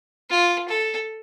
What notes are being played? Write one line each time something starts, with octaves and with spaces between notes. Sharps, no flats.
F4
A4